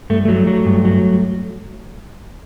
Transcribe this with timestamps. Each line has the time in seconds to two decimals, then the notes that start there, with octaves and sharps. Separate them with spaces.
0.10 G2 A3
0.25 F#3 A3
0.47 F#3
0.66 G2
0.85 F#3